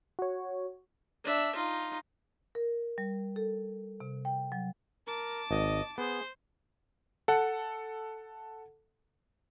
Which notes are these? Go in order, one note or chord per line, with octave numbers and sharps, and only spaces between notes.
F#4 C#5
D4 E5
D#4 F4
A#4
G3
A4
C3
G5
F#3
A#4 A5 D6
G#1 D#5
B3 G#4 C5
A4 F#5